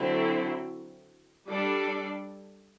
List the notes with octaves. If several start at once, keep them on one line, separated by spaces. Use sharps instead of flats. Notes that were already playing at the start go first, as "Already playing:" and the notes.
Already playing: D3 F#3 C4 E4 A4
G3 D4 A4 D5